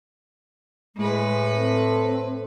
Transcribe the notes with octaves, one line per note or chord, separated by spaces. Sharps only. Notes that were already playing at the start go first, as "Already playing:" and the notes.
A2 G#3 B4
C4 A4